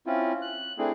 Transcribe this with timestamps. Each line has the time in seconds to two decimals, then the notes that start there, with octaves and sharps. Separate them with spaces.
0.06 C4 C#4 E4 F4
0.42 F#6
0.78 A3 C4 D4 E4 G#4